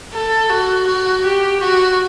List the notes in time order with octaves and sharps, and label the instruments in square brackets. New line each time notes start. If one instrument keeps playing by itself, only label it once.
[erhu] A4
F#4
F#4
G4
F#4